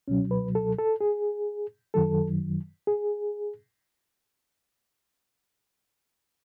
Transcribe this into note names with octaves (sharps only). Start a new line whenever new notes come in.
C#2 B2 F#3 C#4
B4
A4
A4
G#4
F#2 D#3 F#3 A4
G#4